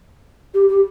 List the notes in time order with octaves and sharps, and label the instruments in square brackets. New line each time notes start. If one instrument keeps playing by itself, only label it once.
[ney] G4
G4